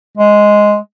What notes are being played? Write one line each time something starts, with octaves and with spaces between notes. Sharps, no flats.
G#3